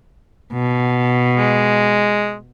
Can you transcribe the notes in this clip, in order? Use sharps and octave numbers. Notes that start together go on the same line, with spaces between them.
B2
G#3